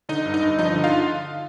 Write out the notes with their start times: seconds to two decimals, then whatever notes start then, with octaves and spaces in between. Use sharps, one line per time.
0.09 D3 D#4 D#5
0.25 G2
0.34 D#4 D#5
0.43 G2
0.59 F3 D#4 D#5
0.75 D3
0.84 F4 F5